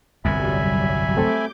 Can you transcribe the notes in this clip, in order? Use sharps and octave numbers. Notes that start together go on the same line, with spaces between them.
G1 C2 F2 F#3 G3 E5 G#5 B5
A3 C4 A4 D6 G6